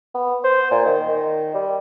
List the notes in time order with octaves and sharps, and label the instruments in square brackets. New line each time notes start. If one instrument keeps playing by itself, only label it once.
[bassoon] B3
C5
A#2
D#3
D#3
G3